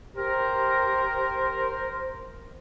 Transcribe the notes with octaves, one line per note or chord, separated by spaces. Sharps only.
G4 A#4 C5